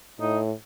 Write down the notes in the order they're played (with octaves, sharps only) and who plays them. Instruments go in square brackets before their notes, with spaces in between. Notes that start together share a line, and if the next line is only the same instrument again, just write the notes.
[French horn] A2 [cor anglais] D#4